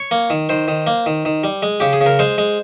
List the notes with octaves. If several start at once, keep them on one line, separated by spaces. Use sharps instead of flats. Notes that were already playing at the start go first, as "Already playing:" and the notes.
Already playing: C#5
A#3
D#3
D#3 C5
D#3
A#3
D#3
D#3
G3
G#3
C#3 G4
G#4
C#3
A#4
G#3 C5
G#3